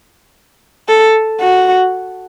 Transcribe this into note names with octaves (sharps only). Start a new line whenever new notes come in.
A4
F#4